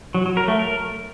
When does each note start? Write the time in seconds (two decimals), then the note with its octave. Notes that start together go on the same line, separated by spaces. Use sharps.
0.15 F#3
0.26 F#3
0.37 A#4
0.48 A3
0.59 A#4